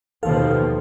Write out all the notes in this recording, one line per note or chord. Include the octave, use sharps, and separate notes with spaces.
D#2 B2 F3 A4 F5